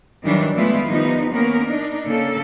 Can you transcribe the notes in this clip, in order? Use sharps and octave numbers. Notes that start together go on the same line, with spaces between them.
D#3 E3 F#3 G3 D4
E3 G#3 A3 B3 E4 F4
D#3 F3 G3 B3 D#4
A#3 B3 C#4 A#4
D4 D#4
C#3 A#3 A4